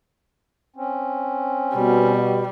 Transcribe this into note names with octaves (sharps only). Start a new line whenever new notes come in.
C4 C#4
B2 G3